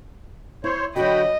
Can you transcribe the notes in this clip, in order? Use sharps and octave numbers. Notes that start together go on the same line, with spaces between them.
E4 C5 C#5
D3 F#3 F#4 D#5 G5 B5